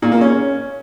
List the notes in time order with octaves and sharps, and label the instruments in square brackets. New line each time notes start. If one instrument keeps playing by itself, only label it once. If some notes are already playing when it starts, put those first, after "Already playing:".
[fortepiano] A#2
A#3
C#4